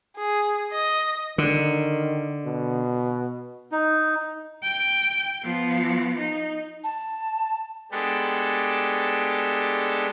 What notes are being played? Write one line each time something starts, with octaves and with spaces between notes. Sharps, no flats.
G#4
D#5
D3 D#3
B2
D#4
G5
F3 B3
D#4
A5
G#3 B3 D4 G4 A4